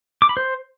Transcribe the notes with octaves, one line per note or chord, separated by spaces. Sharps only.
D6
B5
C5